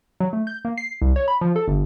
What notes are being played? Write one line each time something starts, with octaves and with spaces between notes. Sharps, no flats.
F#3
A3
G6
A#3
C7
C2
C#5
B5
F3
A4
G1